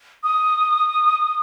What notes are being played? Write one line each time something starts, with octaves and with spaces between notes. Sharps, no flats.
D#6